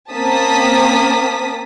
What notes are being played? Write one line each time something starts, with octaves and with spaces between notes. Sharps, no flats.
A#3 C4 C#4 A5 D#6 B6